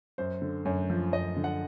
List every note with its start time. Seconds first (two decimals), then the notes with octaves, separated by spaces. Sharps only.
0.18 F#2 C5
0.42 D3
0.65 F#2 C#5
0.90 F3
1.13 F#2 D#5
1.36 D3
1.44 F#5